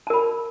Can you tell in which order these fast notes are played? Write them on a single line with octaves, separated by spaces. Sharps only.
A5 A#4 B5